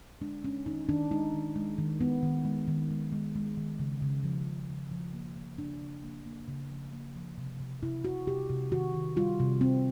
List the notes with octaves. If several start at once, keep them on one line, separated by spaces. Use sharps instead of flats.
G#3 D4
G#3 C#4
D#3 D#4
D#3 D4
G#3 D#4
D#3
G#3
D#3
G#3 B3
D#3
G#3
D#3
G#3
G#3
G#3
D#3
C#3
C#3
F3
C#3
C#3
F3
A#3
A#3
C#3 D4
C#3
A#3
A#3
C#3
F3
A#3
F3
C3
C3
C3 E4
C3 F#4
C3 G4
C3
D#3 F#4
D#3
G3 F4
C3
C3 C4